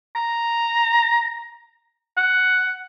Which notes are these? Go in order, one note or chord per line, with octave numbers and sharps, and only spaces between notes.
A#5
F#5